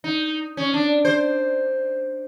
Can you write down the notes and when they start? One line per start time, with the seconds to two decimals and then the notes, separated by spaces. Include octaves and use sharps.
0.04 D#4
0.57 C#4
0.74 D4
1.05 C5